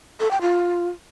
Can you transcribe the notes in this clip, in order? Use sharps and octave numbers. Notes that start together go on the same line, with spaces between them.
A4
G5
F4